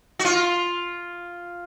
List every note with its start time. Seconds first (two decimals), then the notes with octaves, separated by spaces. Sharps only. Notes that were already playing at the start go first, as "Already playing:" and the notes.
0.19 F#4
0.25 F4